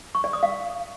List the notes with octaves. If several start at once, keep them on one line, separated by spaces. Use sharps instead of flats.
C#6
D5
D#6
F5